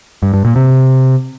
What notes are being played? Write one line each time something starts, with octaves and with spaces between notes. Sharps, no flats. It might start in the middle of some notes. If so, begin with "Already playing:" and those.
G2
G2
A#2
C3